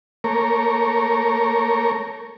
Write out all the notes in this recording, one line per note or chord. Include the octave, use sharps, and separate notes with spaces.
A3 A#3 A#4 C#5